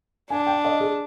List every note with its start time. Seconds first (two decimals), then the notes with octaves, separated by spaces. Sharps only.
0.30 D4 G#5
0.47 G5
0.65 D#5
0.81 G#4